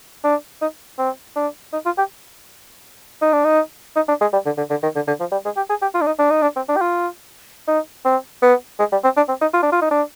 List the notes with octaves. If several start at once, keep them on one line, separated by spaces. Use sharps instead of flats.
D4
D#4
C4
D4
D#4
F4
G4
D#4
D4
D#4
D#4
D4
G#3
G3
D3
D3
D3
D#3
D3
D3
F3
G3
G#3
G4
G#4
G4
F4
D4
D#4
D4
D#4
D4
C4
D4
G4
F4
D#4
C4
B3
G#3
G3
C4
D4
C4
D#4
F4
D4
F4
D#4
D4